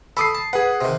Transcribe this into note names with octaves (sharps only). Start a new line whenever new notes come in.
A4 B5 D6 D#6 C7
A5
G#4 B4 F#5
C3 D#3